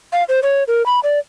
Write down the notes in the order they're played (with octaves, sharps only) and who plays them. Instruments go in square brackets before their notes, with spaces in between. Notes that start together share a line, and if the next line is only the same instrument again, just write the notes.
[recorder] F5
C5
C#5
A#4
B5
D5